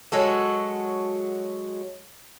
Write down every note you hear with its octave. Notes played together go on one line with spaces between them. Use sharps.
F#3 G#3 F#4 A4